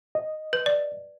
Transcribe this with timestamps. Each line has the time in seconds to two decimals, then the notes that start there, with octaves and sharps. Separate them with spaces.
0.15 D#5
0.53 B4
0.66 D5